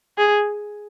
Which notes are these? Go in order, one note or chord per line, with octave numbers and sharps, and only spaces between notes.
G#4